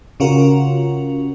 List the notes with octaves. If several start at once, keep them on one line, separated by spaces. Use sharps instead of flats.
C#3 C#4 F4 F#4 A#4